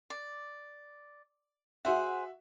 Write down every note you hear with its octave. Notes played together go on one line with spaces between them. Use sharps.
D5
F#4 G#4 C5 E5 F#5